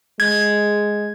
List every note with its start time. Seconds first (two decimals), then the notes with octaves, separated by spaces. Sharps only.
0.20 G#3 G#6